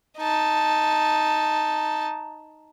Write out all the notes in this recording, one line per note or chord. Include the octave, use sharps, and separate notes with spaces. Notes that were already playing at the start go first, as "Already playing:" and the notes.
D#4 A5